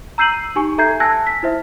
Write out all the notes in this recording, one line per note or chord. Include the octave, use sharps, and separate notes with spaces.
A#5 E6 G6 C7 D#7 F#7
D#4 G4 G#5 C#6
A4 E5 A#5 G6 G#6 C7
G#5 A5 E6 F#6 G#6 A#6
B6
E4 C5 E5